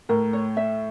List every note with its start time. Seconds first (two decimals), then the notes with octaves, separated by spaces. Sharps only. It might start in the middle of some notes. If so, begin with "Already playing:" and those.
0.09 A2 A#4
0.33 C#5
0.57 E5